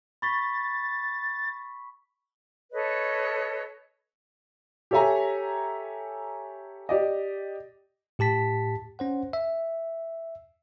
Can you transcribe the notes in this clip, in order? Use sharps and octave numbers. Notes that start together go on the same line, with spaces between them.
B5 C#6 A6 B6
A4 B4 C#5 D#5
G4 A4 C#5 E5 G#5 A#5
G4 D5 D#5
A2 G4 A5 B6
C#4 C5 F#5
E5